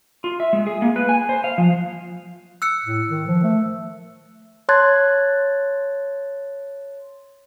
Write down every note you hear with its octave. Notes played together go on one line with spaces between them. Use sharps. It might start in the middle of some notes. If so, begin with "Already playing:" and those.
F4
E5
G#3
G#4
A#3
B4
G#5
C5
F5
F3
E6 F#6 C#7
A2
D#3
F3
A3
C#5 A5 C6 F#6 G#6 A6